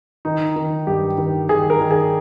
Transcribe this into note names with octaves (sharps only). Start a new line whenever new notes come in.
D#3 D#4
D#3
G2 G4
D#3
D#3 G#4
A#4
D#3
G#4